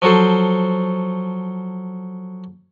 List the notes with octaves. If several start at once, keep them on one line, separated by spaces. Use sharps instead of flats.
F3 F#3 F#4 A4 C5